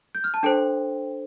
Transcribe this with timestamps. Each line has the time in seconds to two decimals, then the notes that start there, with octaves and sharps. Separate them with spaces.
0.15 G6
0.24 F6
0.34 A5
0.43 D4 A4 C5 G5